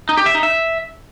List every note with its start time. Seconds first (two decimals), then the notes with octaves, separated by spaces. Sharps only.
0.09 D#4
0.17 G4
0.26 E5
0.35 D#4
0.43 E5